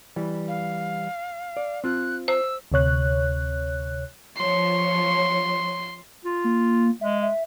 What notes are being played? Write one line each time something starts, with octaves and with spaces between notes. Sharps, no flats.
E3 G3
F5
D5
C4 F4 F#6
C5 E6
D2 C3 C#5 F#6
F3 C#5 C6
F4
A#3
G#3 E5
E5